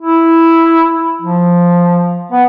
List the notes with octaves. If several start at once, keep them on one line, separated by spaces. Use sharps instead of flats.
E4
F3
B3